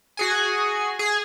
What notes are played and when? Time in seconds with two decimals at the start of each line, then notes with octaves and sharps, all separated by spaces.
0.17 F#4 G#4 G#5
0.99 G#4